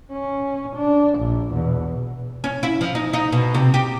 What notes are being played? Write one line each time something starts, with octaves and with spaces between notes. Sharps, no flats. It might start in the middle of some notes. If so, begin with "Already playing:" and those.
C#4
D4
A#1
E2 B2
C#4
E4
F3
D#4
D#4
B2
C3
G4